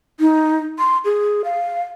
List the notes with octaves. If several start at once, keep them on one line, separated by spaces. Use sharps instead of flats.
D#4
C6
G#4
F5